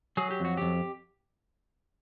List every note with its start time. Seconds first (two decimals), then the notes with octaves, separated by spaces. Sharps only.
0.17 F#3 G#4
0.31 G4
0.40 F2 F#4
0.57 F2 G4